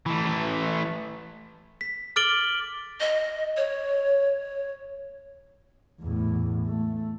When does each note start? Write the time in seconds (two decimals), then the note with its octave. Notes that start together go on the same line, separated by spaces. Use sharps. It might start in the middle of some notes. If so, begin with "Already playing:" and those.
0.06 E3 A3
1.81 B6
2.16 D6 F6 A6 D7 F#7 G7
3.00 D#5
3.57 C#5
6.01 E2 A2
6.66 A3